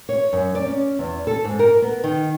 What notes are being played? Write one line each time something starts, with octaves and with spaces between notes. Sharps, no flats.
C#5
F#2
D5
C#4
E2
A4
G#2
A#4
B3
D#3